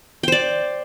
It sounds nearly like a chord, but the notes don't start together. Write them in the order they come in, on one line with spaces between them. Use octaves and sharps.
G5 C5 D5